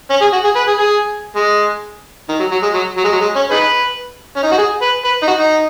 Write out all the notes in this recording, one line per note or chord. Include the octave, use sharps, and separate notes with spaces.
C#4
G#4
F#4
G#4
B4
G#4
G#4
G#3
D#3
F#3
F#3
G#3
F#3
F#3
G#3
F#3
G#3
C#4
D#4 G#4 B4
C#4
D#4
F#4
G#4
B4
B4
D#4
F#4
D#4